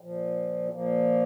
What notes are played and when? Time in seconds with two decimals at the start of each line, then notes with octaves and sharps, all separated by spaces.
0.01 A#2 F3
0.71 A#2 F3 A#3